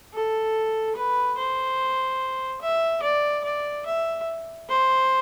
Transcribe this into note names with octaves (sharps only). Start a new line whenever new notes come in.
A4
B4
C5
E5
D5
D5
E5
C5